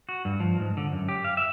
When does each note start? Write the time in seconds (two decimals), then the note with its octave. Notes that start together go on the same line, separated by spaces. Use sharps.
0.09 F#4
0.25 G2
0.40 F3
0.60 G#2
0.77 D3
0.92 F#2
1.09 G4
1.24 F5
1.37 E5